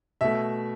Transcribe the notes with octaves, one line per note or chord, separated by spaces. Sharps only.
B2 A3 E5